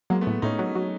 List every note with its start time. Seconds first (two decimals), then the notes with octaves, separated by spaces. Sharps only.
0.10 F#3 G#3 A#3
0.21 A3 B3
0.27 A2
0.42 A2 C#4 D#4
0.59 F#3
0.75 F#3